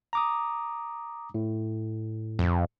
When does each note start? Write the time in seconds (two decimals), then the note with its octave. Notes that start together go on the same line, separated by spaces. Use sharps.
0.13 A#5 D6 D#6
1.34 A2
2.39 F2